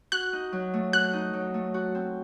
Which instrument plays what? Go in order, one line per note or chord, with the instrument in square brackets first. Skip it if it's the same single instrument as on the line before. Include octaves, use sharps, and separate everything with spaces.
[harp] F#4 [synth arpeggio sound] F#6
[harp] D#4
F#3
A3
[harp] F#4 [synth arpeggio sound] F#6
[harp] D#4
F#3
A3
F#4
C4